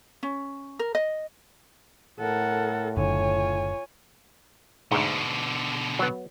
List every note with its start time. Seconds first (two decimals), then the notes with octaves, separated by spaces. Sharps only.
0.23 C#4
0.79 A#4
0.95 D#5
2.20 A2 A4 A#4 F#5
2.97 F#1 D3 F4 C#5 G#5
4.91 D2 G#2 B2 D3
5.99 F#3 B3